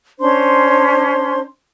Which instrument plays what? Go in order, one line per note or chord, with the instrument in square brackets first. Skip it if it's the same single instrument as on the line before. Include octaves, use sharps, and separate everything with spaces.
[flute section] C#4 D4 C5 C6